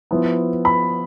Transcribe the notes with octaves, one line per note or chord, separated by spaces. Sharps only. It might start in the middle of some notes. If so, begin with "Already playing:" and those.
F3 B3 E4
B5